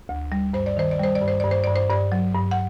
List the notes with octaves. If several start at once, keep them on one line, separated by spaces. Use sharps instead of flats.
D2
G3
G2 C5
D5
D#3 C5
D5
G3 C5
D5
G2
C5
G2 D5
C5
G2 D5
C5
G2 D5
F#3
G2
F#5